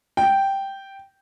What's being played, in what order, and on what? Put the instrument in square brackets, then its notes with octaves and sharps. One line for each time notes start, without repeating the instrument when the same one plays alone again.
[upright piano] G5